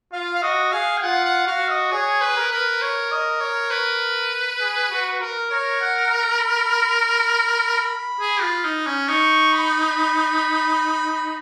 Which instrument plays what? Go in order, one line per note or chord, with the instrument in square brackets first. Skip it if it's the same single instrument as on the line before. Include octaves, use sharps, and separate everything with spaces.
[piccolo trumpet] F4 [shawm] F5
[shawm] F5
[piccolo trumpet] F#4 [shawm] D#5
[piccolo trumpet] G#4 [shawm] F5
[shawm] G#5
[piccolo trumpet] F4 [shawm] F#5
[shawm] F#5
[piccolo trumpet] F#4 [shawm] F5
[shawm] D#5
[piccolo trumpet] G#4 [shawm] C#5
[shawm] B4
[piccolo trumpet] A#4
[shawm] B4
C#5
D#5
C#5
B4
[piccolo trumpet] G#4
F#4
A#4
[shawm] A#4 [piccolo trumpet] C#5
[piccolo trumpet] F#5
A#5
B5
B5
[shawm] G#4
F4
D#4
C#4
[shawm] D#4 [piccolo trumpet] C#6
[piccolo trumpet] B5